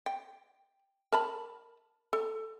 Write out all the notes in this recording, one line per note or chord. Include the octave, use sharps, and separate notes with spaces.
G5
A#4 A5 B5
A4